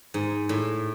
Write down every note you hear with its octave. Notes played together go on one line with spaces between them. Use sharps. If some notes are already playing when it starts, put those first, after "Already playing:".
G#2
A2